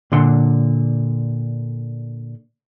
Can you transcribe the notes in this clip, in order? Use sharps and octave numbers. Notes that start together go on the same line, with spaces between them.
A#2 D3 C6